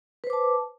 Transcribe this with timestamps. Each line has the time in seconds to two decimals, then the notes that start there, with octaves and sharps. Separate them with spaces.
0.24 B4
0.27 C5
0.30 D6
0.33 A5